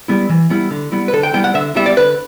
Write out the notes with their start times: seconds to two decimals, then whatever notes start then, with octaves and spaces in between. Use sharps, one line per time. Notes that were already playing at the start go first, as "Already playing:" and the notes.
0.08 G3 B3 E4
0.29 E3
0.50 G3 B3 E4
0.71 D3
0.92 G3 B3 E4
1.08 B4
1.13 D3 A4
1.23 G5
1.33 G3 B3 E4 G5
1.44 F#5
1.54 D3 E5
1.75 G3 B3 E4 E5
1.86 D5
1.97 D3 B4